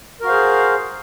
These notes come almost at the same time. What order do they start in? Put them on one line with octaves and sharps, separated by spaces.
A#4 F#4 F5 C5 G#4